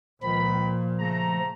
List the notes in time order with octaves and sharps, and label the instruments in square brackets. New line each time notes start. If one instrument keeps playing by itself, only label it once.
[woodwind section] C#2 D#3 B5 [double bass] A#2 [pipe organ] F3
[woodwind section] C#3 A3 A#5